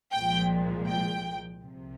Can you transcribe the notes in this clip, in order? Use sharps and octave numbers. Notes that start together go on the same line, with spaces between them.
C2 A#2 F3 G#3 G5
G5
C2 C3 F3